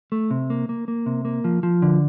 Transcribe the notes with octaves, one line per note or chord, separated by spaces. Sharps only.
A3
C3
A#3
A#3
A#3
C3
A#3
F3
F3
D3